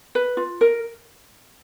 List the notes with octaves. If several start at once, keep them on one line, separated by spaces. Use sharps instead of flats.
B4
F4
A#4